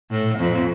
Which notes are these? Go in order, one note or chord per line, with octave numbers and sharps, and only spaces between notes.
A2
F2